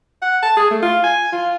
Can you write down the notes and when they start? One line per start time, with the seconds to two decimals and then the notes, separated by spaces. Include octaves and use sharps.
0.22 F#5
0.43 A5
0.57 G#4
0.71 A3
0.82 F4
1.04 G#5
1.32 F4